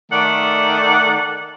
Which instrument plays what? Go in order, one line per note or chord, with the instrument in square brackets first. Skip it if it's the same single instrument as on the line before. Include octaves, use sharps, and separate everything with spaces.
[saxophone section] D#3 A3 D5 F#5